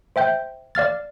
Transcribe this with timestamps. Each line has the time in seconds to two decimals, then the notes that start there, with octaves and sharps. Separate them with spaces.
0.16 C5 E5 G5 G6
0.75 D5 F5 F6 A6